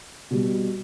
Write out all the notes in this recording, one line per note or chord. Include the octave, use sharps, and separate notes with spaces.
B2 G3